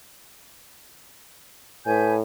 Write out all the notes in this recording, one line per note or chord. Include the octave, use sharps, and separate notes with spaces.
A2 B4 G#5 G6